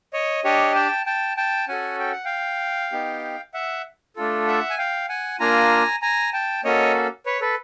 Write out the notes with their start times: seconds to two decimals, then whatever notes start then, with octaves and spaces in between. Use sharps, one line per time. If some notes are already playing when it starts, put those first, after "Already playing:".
0.13 C#5 D#5
0.44 D4 G4 C#5 D#5
0.75 G5 A5
1.06 G5 A5
1.37 G5 A5
1.68 C#4 F#4 A4 F#5 G#5
1.99 G5
2.12 F#5
2.25 F5 G5
2.92 B3 D#4 G4
3.54 E5 F#5
4.16 A3 D4 F4 A4
4.47 E5 F#5
4.70 G#5
4.78 F5 G5
5.09 F#5 G#5
5.40 A#3 D4 F4 G#5 A#5
6.02 G#5 A#5
6.33 G5 A5
6.64 A#3 C#4 F#4 A4 C#5 D#5
7.26 B4 C#5
7.41 A4 B4